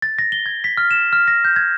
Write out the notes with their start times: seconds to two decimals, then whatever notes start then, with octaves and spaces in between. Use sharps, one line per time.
0.02 A6
0.19 A#6
0.32 G7
0.46 G#6
0.64 B6
0.77 F6
0.91 E7
1.13 F6
1.28 A#6
1.45 G6
1.56 G#6